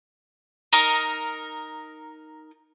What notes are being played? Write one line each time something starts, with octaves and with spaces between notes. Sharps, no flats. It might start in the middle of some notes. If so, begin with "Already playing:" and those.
D#4 A#4